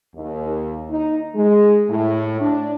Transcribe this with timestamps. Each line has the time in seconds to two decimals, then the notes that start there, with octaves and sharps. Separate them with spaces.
0.15 D#2
0.91 D#4
1.35 G#3
1.90 A2
2.40 D4